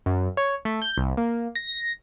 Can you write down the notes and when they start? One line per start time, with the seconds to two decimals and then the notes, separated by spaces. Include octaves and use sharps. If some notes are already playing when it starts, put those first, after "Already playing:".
0.06 F#2
0.37 C#5
0.65 A3
0.82 G6
0.98 C2
1.17 A#3
1.56 A#6